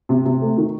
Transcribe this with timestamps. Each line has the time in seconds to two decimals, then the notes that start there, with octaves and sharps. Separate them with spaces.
0.09 C3
0.25 C3
0.42 A3
0.57 D#3